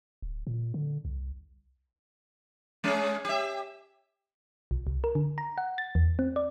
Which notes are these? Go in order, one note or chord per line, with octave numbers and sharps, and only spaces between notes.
D1
A#2
D3
C2
G#3 C#4 G#4
G4 E5
B1
C2
A#4
D3
A#5
F#5
A6
E2
C4
D5